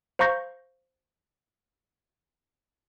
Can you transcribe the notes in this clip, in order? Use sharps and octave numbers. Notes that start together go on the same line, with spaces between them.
C5 F5 A#5 C#6 G6 A#6